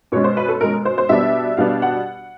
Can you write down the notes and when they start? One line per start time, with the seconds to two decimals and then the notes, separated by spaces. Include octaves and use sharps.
0.12 B2 G#3 C#4 C#5
0.24 C5
0.37 B4
0.48 A4
0.61 B2 G#3 C#4 A#4
0.85 C5
0.98 C5
1.09 B2 G3 B3 D4 E5
1.57 B2 G3 B3 D4 F5
1.82 F#5